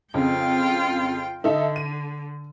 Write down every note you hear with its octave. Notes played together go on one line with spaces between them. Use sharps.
F2 C#3 F4 G5
D3 D#4 A4 E5
D#7